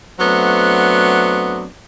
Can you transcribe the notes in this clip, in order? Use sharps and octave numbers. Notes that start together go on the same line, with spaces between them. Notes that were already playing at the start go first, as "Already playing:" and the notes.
F#3 A3 B3 C4 D4